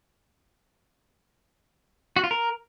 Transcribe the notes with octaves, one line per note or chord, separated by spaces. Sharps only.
F#4
F4
A#4